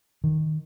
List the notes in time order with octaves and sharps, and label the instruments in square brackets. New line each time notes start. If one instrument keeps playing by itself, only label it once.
[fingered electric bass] D#3